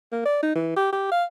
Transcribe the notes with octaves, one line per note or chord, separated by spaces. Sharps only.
A#3
D5
D#4
E3
G4
G4
F5